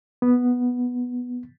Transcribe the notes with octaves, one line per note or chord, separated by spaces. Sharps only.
B3